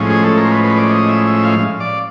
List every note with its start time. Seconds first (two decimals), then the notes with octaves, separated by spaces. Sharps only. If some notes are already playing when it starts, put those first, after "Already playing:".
Already playing: A2 F3 G#3 C#4
0.10 G#4
0.24 A4
0.37 A#4
0.45 C5
0.51 B4
0.64 B4
0.77 D5
0.90 D#5
1.09 E5
1.27 E5
1.45 F5
1.80 D5